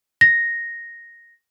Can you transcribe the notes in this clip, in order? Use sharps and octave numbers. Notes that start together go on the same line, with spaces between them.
A#6